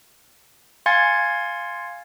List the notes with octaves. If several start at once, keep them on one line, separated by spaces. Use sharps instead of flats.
F5 G#5 C6 G#6 A6 C#7